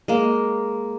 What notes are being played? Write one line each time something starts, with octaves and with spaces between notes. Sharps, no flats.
G#3 A#3